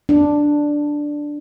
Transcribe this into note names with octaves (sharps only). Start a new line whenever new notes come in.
D4